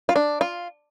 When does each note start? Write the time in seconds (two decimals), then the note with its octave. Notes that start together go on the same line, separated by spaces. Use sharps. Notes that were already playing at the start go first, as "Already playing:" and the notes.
0.09 F4
0.16 D4
0.41 F4